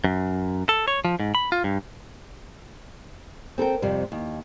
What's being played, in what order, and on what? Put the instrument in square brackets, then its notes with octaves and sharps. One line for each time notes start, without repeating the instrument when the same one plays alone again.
[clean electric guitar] F#2
A4
C#5
F3
G#2
B5
F4
G2
[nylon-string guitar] C4 A4 A#4 G5
F2 C3 G3
D#2